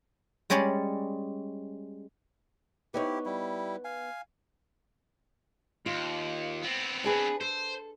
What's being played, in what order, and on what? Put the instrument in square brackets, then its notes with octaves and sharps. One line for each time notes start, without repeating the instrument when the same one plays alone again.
[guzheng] G3 G#3 C#4 C#5 D5
[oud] B3 D#4 C#5 [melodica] E4 G4
[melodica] G3 E4
F5 G#5
[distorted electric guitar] D#2 [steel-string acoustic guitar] F4
[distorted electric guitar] B3 C4
[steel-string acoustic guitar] D4 G#4 B4
[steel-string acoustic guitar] A4 [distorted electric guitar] C5